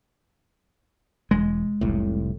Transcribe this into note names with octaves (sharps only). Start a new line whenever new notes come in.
E1 G#3
F1 C2 A2